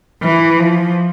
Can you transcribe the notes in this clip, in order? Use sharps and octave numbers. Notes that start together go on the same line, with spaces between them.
E3
F3